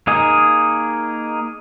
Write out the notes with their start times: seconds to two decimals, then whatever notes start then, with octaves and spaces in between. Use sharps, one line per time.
0.07 A#3 D#4 G#4